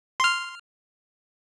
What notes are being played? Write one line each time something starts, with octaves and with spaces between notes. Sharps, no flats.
C6 F6